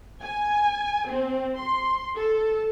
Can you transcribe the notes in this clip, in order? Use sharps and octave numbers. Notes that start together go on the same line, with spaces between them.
G#5
C4
C6
A4